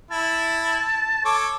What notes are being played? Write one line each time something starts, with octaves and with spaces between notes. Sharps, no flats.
E4 A5
A4 C#5 D6